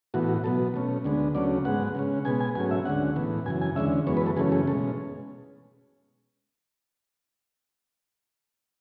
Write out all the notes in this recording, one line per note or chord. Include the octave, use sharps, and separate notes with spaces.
A2 E3 B3 F#4
F#4
B2 F#3 B3 A4
B2 A3 C#4
D2 D3 G#3 B3
D2 C#3 F#3 A3 C#4 D5
G#2 G#3 B3 F#5
C#3 G#3 C#4
B2 G#3 B3 G#5
G#5
G#2 F#3 A3 C#4 G#5
E5
D2 D3 G#3 C#4 F#5
A2 E3 B3
F#2 C#3 E3 G#5
G#5
E2 D3 G#3 C#4 E5
F#2 E3 G#3 B3 C#5
B4
A4
F#2 C#3 E3 A3 C#4 G#4
G#4
B2 G#3 C#4 A4